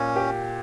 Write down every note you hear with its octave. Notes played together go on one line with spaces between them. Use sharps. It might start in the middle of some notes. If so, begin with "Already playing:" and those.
Already playing: A#2 C#4
G4